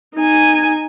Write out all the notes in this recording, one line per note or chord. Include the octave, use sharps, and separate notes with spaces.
D#4 G#5